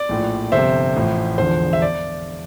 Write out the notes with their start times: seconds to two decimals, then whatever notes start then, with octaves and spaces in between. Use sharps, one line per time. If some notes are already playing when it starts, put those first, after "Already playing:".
Already playing: D5
0.09 A#1 A2 F3
0.52 G1 F2 C3 C5 E5
0.96 A1 A2 F3
1.38 E1 E2 D3 F3 C5
1.73 E5
1.82 D5